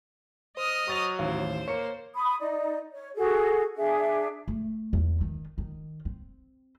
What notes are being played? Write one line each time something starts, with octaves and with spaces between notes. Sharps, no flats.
C5 D#5 D#6 F6
F#3 C#6 A6 F7
A1 D#2 C5 F5
A#3 C#5 C#7
B5 D#6
D#4 D5
C#5
F#4 G#4 A4
D4 G#4 E5
A3
E2
D#3
D#3
C4